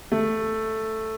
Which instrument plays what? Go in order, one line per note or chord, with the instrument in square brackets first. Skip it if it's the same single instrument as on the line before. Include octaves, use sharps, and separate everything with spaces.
[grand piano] A3